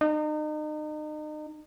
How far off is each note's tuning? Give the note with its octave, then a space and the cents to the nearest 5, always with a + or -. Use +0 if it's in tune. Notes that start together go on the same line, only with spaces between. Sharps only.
D#4 -35